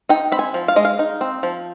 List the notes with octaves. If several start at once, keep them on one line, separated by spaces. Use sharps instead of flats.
D#4 G5
C4 B5
G#5
F3
F5
G#3 D#5
F5
D#4
C4
F3